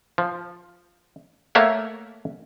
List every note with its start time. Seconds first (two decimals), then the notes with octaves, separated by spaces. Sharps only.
0.18 F3
1.55 A3 A#3 C#5 E5 F#5